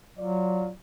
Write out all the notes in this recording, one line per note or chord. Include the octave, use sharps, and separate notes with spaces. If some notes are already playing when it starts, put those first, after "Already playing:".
F#3 F4 D5